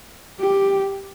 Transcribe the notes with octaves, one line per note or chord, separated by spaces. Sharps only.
G4